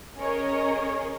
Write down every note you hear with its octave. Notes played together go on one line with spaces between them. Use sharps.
C#4 G#4 A#4 C#5 D#5